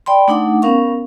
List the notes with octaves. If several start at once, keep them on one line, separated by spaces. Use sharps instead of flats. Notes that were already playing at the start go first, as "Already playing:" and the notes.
D5 G5 B5 C6
A3 D4 D#4 F#5 D6
B3 C#4 A#4 F5 C#6